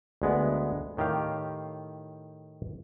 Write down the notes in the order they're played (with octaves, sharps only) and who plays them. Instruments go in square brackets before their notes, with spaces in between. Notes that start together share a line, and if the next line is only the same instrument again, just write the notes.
[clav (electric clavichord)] D2 G#3 B3
A2 D#3 G4 F5